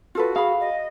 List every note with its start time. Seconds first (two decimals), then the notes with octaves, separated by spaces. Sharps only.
0.15 F4 F#4 A4 B4
0.36 G#4 F5 B5
0.60 D#5